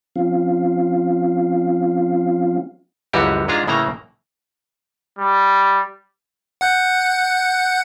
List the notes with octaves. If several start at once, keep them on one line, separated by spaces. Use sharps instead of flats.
F3 C4 C#4 F4 F5
C#2 F#2 E3 G3 F#4 G4
G#2 G#3 D4 F4 A#5
A2 C#3 E3 A#3 A#5
G3
F#5 F#6 G6